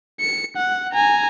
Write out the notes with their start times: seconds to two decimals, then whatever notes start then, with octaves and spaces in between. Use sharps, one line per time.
0.20 C#7
0.57 F#5
0.92 G#5 A#5